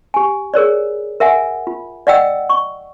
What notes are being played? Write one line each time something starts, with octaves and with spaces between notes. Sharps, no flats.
G4 G#5
G#4 A#4 C#5 D5
A#4 E5 F#5 G#5
F4
D5 D#5 F#5 G5 E6
C#6